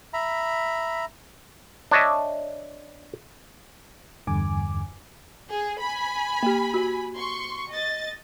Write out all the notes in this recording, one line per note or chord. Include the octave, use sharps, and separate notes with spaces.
E5 A#5 B5
D4 C#5 D#5 E5
E2 G2 D3 G#5 D6
G#4
G#5 B5
A#3 G4
F#4
C6 C#6
D#5 A6